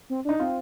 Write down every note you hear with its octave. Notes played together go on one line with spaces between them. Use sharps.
C4
D4 D#4
C4 F4